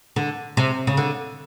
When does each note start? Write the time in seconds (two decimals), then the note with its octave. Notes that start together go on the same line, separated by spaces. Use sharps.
0.16 D3
0.57 C3
0.87 C#3
0.97 D3